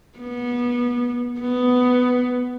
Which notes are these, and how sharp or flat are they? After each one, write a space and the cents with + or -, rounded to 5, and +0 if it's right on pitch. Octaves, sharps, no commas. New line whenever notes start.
B3 -25
B3 +10